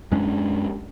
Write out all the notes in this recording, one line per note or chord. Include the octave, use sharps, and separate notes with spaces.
F#2 G#3 C#4 D4